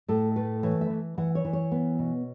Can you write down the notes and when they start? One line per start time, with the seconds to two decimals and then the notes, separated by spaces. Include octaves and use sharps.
0.08 A2 A4
0.36 A3 B4
0.63 E3 C#5
0.81 E5
0.90 E3
1.18 E3 F#5
1.35 C#5
1.45 E3
1.53 C#5
1.72 B3
1.99 B2